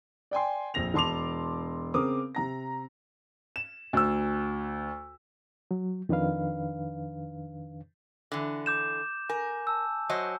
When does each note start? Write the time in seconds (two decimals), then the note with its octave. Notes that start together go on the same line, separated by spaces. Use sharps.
0.31 D5 G5 G#5 C6
0.74 A#1 F2 C4 A#6 F7
0.94 E1 A5 C6 D6 F7
1.94 C#3 C4 A#4 D6 D#6
2.35 C3 A#5 A#6
3.56 E7
3.93 D2 E6
5.71 F#3
6.09 F2 D#3 D4 B4 F5
8.32 D3 E3
8.66 D6 G6 E7
9.29 A#4 G#5
9.67 A5 E6
10.09 F#3 C5 D#5